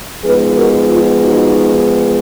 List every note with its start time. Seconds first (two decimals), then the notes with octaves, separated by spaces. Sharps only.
0.24 F3 G#3 B3 D#4 G#4 B4
0.57 F#4 A#4
0.90 F4
1.23 D#4 F#4